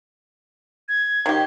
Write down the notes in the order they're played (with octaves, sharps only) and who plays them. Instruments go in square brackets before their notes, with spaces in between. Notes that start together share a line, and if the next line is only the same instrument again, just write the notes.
[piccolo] G#6
[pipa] D#3 G4